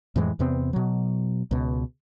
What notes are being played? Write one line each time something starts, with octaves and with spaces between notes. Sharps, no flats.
F2 A2 E3 G#3
E2 C3 B3 C4
B2 F#3
C#2 B2